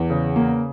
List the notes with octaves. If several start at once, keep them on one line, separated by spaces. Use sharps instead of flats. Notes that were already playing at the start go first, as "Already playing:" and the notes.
Already playing: E2
C#3
A#3